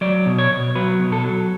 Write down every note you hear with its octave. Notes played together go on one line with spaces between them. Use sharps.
F#3 D5
B2
C#5
B2
F#3 B4
B2
A4
F#3